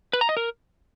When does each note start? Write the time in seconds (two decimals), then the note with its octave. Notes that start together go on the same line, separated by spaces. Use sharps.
0.13 B4
0.21 A#5
0.29 D#5
0.37 A#4